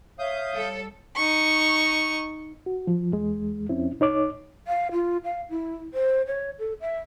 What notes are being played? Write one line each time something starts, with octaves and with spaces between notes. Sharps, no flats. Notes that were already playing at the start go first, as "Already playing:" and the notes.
C#5 E5 F5 D#6 G6
G3 A4
D#4 C#6
F#4
F3
E2 G#3
F2 C4 C#4 E4
C2 D#4 C#5 D6
F5
F4
F5
E4
C5
C#5
A4
E5